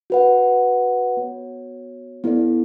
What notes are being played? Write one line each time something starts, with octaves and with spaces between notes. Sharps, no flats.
F#4 B4 F#5
B3 F#4 C#5
B3 E4 A4 D5